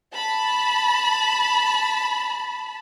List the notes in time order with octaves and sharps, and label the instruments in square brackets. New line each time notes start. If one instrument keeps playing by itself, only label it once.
[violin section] A5 B5